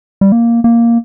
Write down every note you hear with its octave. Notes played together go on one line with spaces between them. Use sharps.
G3
A#3
A#3